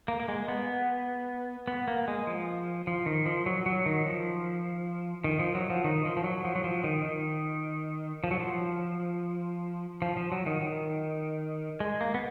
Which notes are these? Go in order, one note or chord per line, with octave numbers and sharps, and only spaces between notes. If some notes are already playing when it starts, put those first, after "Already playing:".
A#3
A#3
G#3
B3
B3
A#3
G#3
F3
F3
D#3
F3
F#3
F#3
D#3
F3
D#3
F3
F#3
F3
D#3
F3
F3
F#3
F3
F#3
F3
D#3
D#3
F3
F#3
F3
F3
F3
F#3
D#3
D#3
G#3
A#3
B3